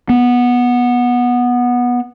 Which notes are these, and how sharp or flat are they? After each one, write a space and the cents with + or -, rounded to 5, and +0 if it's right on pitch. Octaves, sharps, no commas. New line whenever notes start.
B3 -10